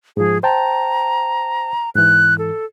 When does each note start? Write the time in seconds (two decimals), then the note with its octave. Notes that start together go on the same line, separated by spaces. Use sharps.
0.17 G#2 F3 G#4
0.43 C5 G5 A5 A#5
1.95 G#2 E3 F#6
2.38 A4